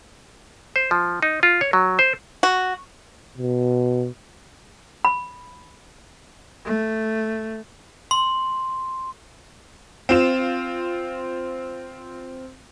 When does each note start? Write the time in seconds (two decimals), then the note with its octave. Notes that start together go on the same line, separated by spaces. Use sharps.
0.76 C5
0.91 F3
1.22 D#4
1.43 F4
1.61 C#5
1.73 F#3
1.99 C5
2.43 F#4
3.38 B2
5.05 B5
6.65 A3
8.11 C6
10.09 C4 F4 E7